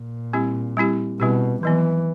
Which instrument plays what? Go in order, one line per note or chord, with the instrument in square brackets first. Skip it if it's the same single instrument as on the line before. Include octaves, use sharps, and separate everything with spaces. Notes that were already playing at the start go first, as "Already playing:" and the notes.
Already playing: [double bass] A#2
[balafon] G3 C4 E4 G4
G3 C4 E4 G4
[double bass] B2 [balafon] G3 C4 E4 G4
[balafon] D#3 F#3 B3 [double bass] E3